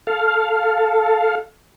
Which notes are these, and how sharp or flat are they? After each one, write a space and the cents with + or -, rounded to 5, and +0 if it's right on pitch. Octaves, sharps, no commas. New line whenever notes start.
A4 +0 F5 +0